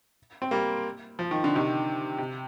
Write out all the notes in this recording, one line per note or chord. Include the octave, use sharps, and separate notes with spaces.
C4
G3 A#3
F3
D#3
D3
C3 D#3
C3